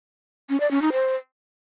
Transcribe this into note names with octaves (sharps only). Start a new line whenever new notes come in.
C#4
D5
C#4
D#4
C5